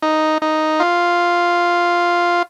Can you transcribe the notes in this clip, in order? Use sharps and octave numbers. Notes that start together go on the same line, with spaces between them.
D#4
D#4
F4